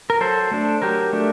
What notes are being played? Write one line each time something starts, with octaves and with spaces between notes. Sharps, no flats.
A#4
F#3 A4 C5
A3 D4
F#3 G4 A#4
A3 D4